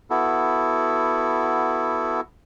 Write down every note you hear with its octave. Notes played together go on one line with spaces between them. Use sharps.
B3 E4 F#4 A4